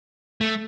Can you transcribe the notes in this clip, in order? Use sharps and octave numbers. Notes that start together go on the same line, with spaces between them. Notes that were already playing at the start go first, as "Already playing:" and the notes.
A3